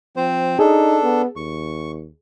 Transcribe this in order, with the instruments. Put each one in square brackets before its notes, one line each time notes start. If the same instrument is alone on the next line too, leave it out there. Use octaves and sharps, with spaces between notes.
[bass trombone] F3 [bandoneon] C4 C5
[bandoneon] D4 A4 [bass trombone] D#4 [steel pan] G#4
[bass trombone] B3
[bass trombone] D#2 [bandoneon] C#6